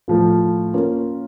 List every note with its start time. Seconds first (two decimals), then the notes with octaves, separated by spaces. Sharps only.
0.08 A2 F3 A3
0.74 A#3 C#4 F4